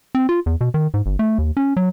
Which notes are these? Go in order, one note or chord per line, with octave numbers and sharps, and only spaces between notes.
C4
F4
E2
B2
D#3
G#2
G1
A3
D#2
C#4
F#3